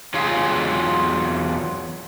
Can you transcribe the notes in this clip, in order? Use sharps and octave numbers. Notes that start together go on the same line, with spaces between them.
E2 F#3 F4 G#4 F5